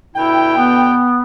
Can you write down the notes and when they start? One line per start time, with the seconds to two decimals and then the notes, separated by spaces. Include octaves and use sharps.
0.16 B2 D3 E4 G5
0.57 B3